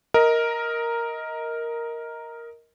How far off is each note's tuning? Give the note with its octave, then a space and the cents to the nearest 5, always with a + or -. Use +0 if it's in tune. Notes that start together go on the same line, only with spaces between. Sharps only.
A#4 +0 D#5 +20